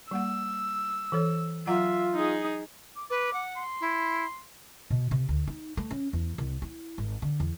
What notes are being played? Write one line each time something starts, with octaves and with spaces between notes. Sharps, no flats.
G3 A#3 F#5 E6
E3 A4 C#5
F#3 F4 E5 F#5 A#5
D#4 G#4
D6
B4 D6
F#5
C6
E4
B2
C3
D2
D#4
A3
C#4
E2
C2
E4
G#1
D3
E2